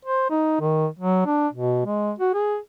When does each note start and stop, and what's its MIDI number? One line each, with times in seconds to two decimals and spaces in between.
0.05 0.29 72
0.30 0.59 63
0.61 0.86 51
0.99 1.24 54
1.26 1.48 62
1.53 1.85 47
1.85 2.12 56
2.19 2.33 66
2.34 2.57 68